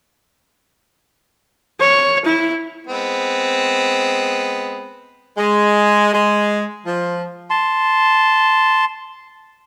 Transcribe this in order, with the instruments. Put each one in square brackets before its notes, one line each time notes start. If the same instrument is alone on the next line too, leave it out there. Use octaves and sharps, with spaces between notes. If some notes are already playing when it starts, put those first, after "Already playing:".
[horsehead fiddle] C#5
E4
[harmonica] G#3 B3 C4
[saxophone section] G#3
G#3
F3
[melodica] A5 C6